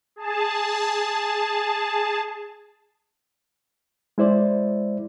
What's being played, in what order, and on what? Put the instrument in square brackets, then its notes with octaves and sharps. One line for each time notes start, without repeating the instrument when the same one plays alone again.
[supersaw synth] G#4 A5
[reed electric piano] G#3 E4 C5 D5